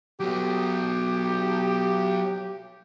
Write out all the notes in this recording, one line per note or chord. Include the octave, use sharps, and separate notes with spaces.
F#3 B3 G4